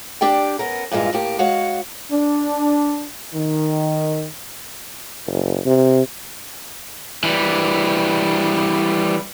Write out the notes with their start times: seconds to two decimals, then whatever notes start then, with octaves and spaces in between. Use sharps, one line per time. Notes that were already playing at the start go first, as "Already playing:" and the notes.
0.21 D4 G4 D5 G5
0.59 B3 C#4 A#4
0.92 G2 A#2 E3 G#3 F4
1.13 A2 A#3 G4
1.39 G#3 F#4 C#5 F5 F#5
2.10 D4
3.34 D#3
5.27 F#1
5.66 C3
7.24 E3 G3